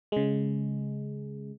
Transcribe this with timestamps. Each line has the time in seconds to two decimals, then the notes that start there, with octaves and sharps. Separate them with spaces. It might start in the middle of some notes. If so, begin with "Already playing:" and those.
0.12 C#3 G#3